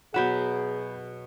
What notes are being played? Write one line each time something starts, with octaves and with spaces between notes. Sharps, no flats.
B2 F#3 G#4 E5 F#5 B5 G6